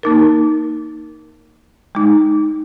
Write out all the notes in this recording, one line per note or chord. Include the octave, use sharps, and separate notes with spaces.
A#3 D#4 A#4
G#3 D#4